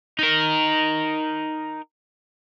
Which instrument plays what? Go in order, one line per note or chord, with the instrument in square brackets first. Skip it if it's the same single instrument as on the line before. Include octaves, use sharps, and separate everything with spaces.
[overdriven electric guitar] D#4 A#4